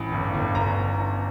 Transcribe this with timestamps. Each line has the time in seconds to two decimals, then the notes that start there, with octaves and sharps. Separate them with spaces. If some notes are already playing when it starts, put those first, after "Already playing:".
Already playing: A1 B5
0.12 G1
0.34 G1
0.55 G1 A#5